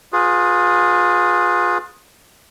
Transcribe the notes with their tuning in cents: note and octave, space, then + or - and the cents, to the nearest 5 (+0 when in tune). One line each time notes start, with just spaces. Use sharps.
F4 +30 G#4 +0 B4 +0